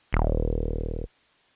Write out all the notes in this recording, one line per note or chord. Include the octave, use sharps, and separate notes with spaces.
D#1